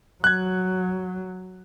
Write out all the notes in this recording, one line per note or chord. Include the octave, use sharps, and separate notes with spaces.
F#3 F#6 G#6